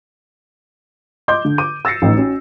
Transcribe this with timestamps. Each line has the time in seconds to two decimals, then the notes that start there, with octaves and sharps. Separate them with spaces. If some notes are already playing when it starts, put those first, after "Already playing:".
1.28 D#5 C6 D6 G6
1.45 D3
1.58 D6 D#7
1.85 E6 A6 A#6 C7 C#7
2.02 A1 D#4
2.17 C#4 F#4